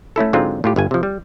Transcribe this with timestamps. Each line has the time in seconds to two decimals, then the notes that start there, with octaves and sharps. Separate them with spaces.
0.16 A3 C#4 E4 A4
0.33 G#2 D3 F#3 G#3 C4 F4
0.64 A2 F4 G4
0.76 G1 G2 G#5
0.91 C3 F3
1.03 G3